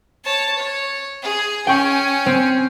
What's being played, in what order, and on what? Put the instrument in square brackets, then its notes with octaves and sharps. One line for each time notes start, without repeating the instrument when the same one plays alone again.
[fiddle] C#5 A5
C#5
G#4
[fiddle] C#4 G#5 [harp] G5 C#6
[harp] C4